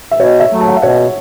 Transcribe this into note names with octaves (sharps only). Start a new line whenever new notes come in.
E5
B2 C#5
E5
F#3 A3
A5
F#5
E5
B2 C#5 F#5